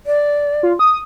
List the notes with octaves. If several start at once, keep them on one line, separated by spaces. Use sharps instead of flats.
D5
F4
D#6